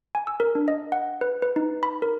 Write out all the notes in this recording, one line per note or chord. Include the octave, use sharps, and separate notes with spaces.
G#5
E6
A#4
D4
D#5
F#5
B4
B4
D#4
B5
A#4